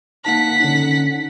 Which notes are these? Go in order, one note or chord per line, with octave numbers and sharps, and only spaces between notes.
A#3 D#4 F#5 A5 B6
D3 C#4 D#4